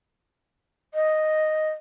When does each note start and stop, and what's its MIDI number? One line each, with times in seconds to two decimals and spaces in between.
0.94 1.70 75